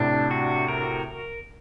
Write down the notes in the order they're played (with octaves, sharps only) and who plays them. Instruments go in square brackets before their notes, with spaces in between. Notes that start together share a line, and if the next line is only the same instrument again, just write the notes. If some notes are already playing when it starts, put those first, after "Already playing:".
Already playing: [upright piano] A2 C3 [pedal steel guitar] D4
[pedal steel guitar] F#4
A#4